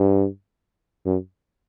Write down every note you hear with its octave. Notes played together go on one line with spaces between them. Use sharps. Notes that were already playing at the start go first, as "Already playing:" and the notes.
Already playing: G2
F#2